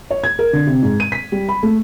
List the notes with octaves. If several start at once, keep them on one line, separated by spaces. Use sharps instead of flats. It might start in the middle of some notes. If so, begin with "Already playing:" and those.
C#5
G#6
A#4
D3
C3
G#2
D#7
B6
G3
B5
A3